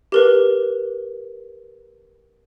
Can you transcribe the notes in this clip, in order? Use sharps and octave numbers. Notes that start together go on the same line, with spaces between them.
G4 A#4 B4